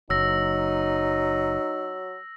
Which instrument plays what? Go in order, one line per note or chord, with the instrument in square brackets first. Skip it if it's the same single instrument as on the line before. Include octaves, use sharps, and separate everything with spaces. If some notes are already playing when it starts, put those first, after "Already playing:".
[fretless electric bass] F#1 [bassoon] F#3 [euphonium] D#4 [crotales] E6 A#6